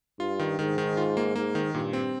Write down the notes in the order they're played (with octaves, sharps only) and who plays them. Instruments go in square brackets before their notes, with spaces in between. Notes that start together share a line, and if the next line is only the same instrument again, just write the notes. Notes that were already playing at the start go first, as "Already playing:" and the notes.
[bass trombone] G2 [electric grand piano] F4
[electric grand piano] D#3
[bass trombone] G#2 [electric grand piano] D#3
[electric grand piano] D#3
F4
A#3
[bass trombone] G#2 [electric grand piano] A#3
[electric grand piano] D#3
[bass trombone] G2 [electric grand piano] A#2
[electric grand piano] C4